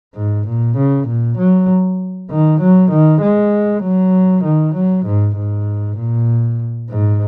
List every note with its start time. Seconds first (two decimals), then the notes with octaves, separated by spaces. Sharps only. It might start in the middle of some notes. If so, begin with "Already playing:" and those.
0.15 G#2
0.46 A#2
0.77 C#3
1.07 A#2
1.37 F#3
2.31 D#3
2.61 F#3
2.91 D#3
3.21 G#3
3.83 F#3
4.44 D#3
4.75 F#3
5.05 G#2
5.36 G#2
5.98 A#2
6.90 G#2